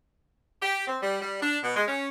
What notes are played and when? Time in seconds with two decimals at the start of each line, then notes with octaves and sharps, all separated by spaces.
0.61 G4
0.87 C4
1.02 G3
1.22 G3
1.41 D4
1.63 B2
1.76 G#3
1.88 C#4